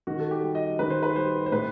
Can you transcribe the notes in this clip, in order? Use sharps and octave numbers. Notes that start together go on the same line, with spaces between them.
D#3 F#4
A4
G4
G3
D#5
D#3 B4
C5
B4
G3 C5
C5
A2 B4